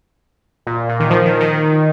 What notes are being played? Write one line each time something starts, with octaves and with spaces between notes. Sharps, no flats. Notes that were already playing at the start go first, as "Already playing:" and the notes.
A#2
A#2
D#3
F3
D#3
D#3